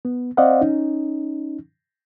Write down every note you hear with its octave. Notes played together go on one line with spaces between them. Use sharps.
B3
C4 C5 D5 D#5 F5 F#5
C#4 D#4